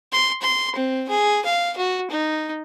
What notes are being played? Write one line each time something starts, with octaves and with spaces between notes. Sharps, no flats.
C6
C6
C4
G#4
F5
F#4
D#4